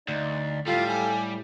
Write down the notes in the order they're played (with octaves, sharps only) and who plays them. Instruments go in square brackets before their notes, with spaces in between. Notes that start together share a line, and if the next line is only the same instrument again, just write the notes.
[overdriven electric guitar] D2 [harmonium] D#4 D5
[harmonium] A2 [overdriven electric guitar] G3 [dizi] F4 [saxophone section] G4 A4 F5
[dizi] G#5